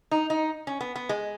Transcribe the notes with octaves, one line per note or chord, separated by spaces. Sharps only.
D#4
D#4
C#4
B3
B3
G#3